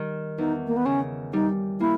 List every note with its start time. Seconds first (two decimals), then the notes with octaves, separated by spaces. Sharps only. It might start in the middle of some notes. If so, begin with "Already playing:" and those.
Already playing: D#3 G3
0.38 E2 D#4
0.67 A#3
0.77 B3
0.86 C#3 C#4
1.33 G3 D#4
1.80 A#3 E4